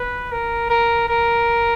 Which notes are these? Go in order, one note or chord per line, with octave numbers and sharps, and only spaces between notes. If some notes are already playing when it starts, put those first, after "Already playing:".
Already playing: B4
A#4
A#4
A#4